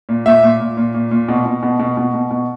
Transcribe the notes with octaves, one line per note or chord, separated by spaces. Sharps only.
A#2
A#2 E5
A#2
A#2
A#2
A#2
A#2
B2
B2
B2
B2
B2
B2
B2